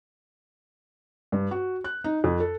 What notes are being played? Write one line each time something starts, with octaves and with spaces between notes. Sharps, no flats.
G2
F#4
F#6
D#4
F2
A4